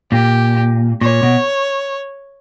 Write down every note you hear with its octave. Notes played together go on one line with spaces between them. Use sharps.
A#2 G4
A#2 C#5
B2